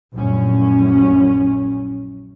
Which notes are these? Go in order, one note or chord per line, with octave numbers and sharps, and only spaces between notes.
A#1 F#2 A2 C#4